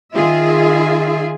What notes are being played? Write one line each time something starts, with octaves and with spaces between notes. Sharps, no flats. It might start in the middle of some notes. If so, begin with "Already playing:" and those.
D#3 F4 G#4 E5